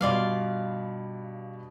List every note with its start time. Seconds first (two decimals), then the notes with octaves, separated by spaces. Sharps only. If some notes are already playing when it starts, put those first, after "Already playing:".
0.01 G2 B2 F4 D5 F5